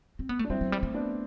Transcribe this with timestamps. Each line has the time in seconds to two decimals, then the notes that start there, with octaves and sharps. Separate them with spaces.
0.19 C4
0.29 B3
0.39 A3 D4
0.50 G3 C4 E4
0.61 F#3
0.72 G3
0.83 A3
0.94 B3 D4